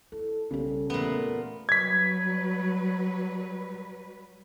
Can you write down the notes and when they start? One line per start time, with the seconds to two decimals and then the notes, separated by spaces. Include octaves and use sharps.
0.12 E4 A4
0.51 B1 C#3 G3 G4 A4
0.90 E2 A#2 A3 B3
1.69 F#3 G3 B4 G#6 B6